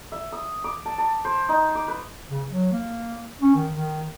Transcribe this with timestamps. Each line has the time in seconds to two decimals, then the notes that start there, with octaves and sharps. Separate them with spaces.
0.12 E5
0.32 D#6
0.64 D6
0.85 A5
0.98 A5
1.25 C5
1.49 D#4
1.75 D6
1.88 B4
2.30 C#3
2.49 F#3
2.72 A#3
3.41 C#4
3.55 D#3
3.74 D#3